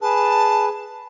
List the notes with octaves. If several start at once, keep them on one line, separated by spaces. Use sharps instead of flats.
G#4 B4 A5